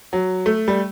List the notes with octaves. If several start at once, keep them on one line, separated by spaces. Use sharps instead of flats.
F#3
A3
G3